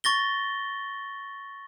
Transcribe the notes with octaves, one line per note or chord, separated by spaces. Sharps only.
C#6 A6 A#6 G7